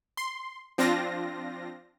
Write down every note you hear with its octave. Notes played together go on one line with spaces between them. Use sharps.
C6
F3 C4 D4 F4 A#6